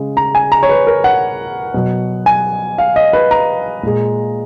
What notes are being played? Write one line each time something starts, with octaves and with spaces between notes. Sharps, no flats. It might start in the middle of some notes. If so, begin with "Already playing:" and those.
Already playing: C#3 G#3
A#5
G#5
A#5
C#5
B4
A#4
F#5
B2 F#3
G#5
F5
D#5
B4
A#5
A#2 G#3